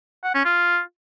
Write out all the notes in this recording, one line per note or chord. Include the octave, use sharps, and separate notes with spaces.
F#5
C#4
F4